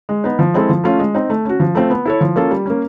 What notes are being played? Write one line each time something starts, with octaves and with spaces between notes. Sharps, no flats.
G#3
B3 D#4
F3
G#3 C4 E4 A4
F3
A3 C#4 F4
G#3
C4 D#4
A3
C#4 F#4
F3
A3 C4 F4
B3
E4 A4 C#5
F3
A#3 C#4 F4 A4
G3
A#3 C#4